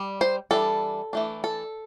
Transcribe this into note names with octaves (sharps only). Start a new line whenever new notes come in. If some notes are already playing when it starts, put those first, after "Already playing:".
Already playing: G3
C5
E3 G3 D4 A4
E3 A3 D4
A4